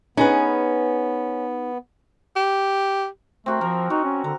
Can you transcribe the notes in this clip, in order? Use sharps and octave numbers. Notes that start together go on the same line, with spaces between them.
B3 C#4 D#4 G#4 B4
G4
A3 C4 F#4 A#4
F3 A#4
D#4 F#4
C#4
D3 A#5